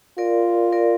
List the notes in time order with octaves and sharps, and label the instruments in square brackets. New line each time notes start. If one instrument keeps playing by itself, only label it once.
[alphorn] F4 [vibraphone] A#4 D5
[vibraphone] A#4 D5